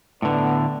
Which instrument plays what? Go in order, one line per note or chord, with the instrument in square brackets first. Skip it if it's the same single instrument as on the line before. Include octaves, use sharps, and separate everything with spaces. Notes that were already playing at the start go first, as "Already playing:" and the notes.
[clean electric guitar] A2 D3 [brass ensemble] B3 D5